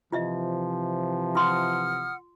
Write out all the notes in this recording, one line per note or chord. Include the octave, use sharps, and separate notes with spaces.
C3 E3 F3 F4 D#5 E5
F4 F#5 C6 D#6 F6